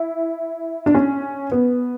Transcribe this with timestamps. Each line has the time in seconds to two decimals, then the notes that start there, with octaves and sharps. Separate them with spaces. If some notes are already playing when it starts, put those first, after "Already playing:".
Already playing: E4
0.86 D4
0.95 C#4
1.52 B3